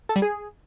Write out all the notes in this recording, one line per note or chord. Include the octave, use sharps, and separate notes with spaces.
A4
G3
G#4